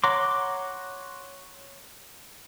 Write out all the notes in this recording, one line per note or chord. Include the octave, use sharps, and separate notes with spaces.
C#5 F#5 A#5 C6 D6